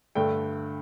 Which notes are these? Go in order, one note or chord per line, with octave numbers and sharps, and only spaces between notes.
G2 D3 A3 G5